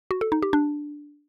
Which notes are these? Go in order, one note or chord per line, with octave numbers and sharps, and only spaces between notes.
F#4
A4
D#4
G4
D4